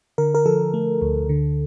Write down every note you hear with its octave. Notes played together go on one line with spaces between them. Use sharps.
D3 A#4
A#4
F3 A4
A3
D2
D3